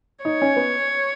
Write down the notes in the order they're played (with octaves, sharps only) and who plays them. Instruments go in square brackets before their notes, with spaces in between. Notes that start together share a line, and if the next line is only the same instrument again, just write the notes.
[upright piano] D#4 [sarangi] C#5
[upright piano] C#4
B3